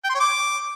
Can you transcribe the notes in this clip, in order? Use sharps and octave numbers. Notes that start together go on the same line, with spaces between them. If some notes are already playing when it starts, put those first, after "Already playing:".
G5
C6
C#5
D6